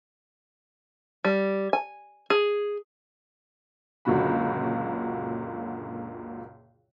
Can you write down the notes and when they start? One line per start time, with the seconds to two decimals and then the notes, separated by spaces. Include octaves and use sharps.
1.24 G3
1.73 G#5
2.30 G#4
4.05 C#2 F#2 A#2 D3 F#4 B5